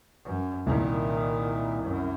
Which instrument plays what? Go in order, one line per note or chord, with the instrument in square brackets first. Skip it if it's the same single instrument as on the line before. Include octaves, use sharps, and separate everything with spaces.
[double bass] F#2
[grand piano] C2 [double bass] A#2 D#3
[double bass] F#2